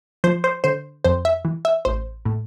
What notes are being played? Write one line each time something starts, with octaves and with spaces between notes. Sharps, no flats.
F3 C5
C5
D3 C5
F2 C5
E5
E3
E5
A1 C5
A2